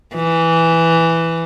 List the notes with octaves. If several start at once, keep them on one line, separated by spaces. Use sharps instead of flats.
E3